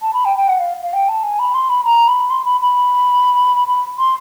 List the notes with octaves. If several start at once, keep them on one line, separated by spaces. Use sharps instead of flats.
A5
B5
G5
G5
F#5
F5
F5
G5
A5
G#5
B5
C6
B5
A#5
B5
C6
B5
B5
B5
C6